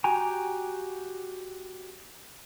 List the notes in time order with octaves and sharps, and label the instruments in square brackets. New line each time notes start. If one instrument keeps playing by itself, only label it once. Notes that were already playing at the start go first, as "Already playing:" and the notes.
[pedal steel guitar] F#4 G4 G5 G#5 A#5